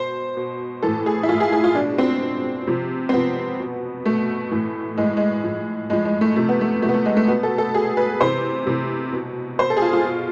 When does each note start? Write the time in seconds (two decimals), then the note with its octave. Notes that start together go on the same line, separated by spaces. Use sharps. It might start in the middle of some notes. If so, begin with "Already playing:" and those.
Already playing: B2 C5
0.37 B2
0.83 A2 E3 A4
1.06 G#4
1.23 E4
1.29 A2 E3 F4
1.40 G#4
1.52 G#4
1.64 F4
1.75 B2 D4
1.98 C4
2.21 B2
2.67 C3 F3
3.09 C4
3.13 C3 F3 B3
3.60 B2
4.05 B2 A3
4.51 A2 E3
4.97 A2 E3 G#3
5.17 G#3
5.44 A2 F3
5.90 A2 F3 G#3
6.05 G#3
6.21 A3
6.36 C3 F3 A3
6.49 B3
6.61 A3
6.82 F3 A3
6.85 C3 B3
6.94 A3
7.05 G#3
7.17 A3
7.28 B2 B3
7.43 A4
7.58 A4
7.74 B2 G#4
7.97 B4
8.21 C3 E3 C5
8.66 C3 E3
9.12 B2
9.59 B2 C5
9.70 A4
9.77 G#4
9.82 F4
9.93 F4
10.05 B2